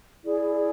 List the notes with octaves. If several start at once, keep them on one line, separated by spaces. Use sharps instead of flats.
E4 G#4 D5